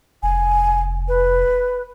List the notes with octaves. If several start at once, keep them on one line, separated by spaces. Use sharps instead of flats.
F1 G#5
B4